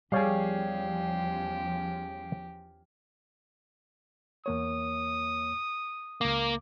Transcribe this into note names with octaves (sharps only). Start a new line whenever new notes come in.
E2 F3 G3 C#4 G4 G#4 C#5 F5
E2 A#3 C#5 D#6
C#2 A#3 D6